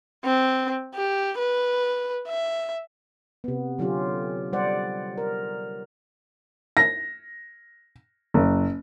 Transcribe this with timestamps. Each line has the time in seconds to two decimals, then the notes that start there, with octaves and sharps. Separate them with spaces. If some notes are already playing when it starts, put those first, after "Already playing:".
0.25 C4
0.95 G4
1.38 B4
2.28 E5
3.44 C3 B3
3.79 D3 F#3 C#4 F4 G4
4.53 G3 C5 D5 F#5
5.18 A#4
6.77 A#6
8.34 F#1